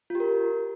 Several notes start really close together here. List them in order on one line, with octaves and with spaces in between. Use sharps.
F4 G4 A#4